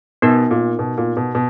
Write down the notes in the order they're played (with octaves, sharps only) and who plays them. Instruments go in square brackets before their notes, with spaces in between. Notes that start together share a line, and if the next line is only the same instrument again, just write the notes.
[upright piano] B2 [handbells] B3 D#4 A#4
[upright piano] A#2
B2
A#2
B2
B2